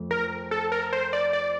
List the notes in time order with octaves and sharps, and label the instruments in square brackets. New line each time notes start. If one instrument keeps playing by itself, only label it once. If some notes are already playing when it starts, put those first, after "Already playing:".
Already playing: [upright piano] F2 A3
[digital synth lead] A#4
A4
A#4
C5
D5
D5